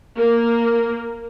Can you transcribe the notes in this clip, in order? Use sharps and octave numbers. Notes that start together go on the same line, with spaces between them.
A#3